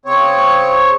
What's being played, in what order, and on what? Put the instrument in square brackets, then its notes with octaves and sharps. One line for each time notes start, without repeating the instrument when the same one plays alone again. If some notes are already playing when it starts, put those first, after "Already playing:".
[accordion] C#3 C4 C#5